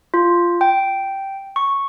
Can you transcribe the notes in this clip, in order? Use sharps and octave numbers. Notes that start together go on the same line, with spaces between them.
F4
G5
C#6